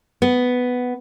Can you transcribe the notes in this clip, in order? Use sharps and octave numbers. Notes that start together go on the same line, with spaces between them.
B3